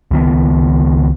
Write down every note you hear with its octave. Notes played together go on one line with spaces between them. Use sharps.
C#2 D#3 B3